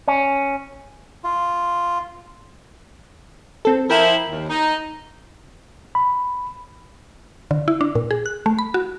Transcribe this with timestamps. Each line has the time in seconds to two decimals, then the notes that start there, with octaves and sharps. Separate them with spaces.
0.08 C#4
1.24 F4
3.65 C4 A4
3.90 F3 E4 A#4 G5
4.28 D#2
4.49 D#4
5.95 B5
7.51 D3
7.68 E4
7.81 D4
7.95 A#2
8.11 G#4
8.26 F#6
8.46 A3
8.59 B5
8.74 F#4